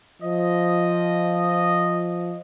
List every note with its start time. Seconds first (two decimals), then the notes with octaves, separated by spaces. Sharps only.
0.22 F3 D#5